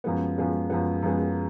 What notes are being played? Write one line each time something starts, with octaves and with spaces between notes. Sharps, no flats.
F#2 F3 G#3 B3
F#2 F3 G#3 B3
F#2 F3 G#3 B3
F#2 F3 G#3 B3